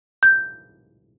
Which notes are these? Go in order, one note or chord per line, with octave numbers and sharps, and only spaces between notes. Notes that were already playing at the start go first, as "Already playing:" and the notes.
G6